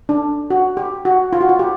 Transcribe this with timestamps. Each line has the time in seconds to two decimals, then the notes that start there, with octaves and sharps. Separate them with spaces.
0.09 D4
0.50 F#4
0.77 G4
1.05 F#4
1.33 F4
1.41 F#4
1.49 F4
1.59 G4